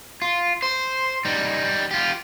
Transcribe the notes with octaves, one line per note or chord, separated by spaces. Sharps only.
F4
C5
G3 D#4
F4 G4